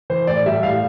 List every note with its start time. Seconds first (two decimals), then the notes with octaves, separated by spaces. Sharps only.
0.10 E3 C5
0.27 A2 D5
0.46 G3 E5
0.63 A2 F5